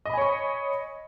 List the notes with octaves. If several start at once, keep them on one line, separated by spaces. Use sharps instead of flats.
C#5 D#5 G#5 B5 C#6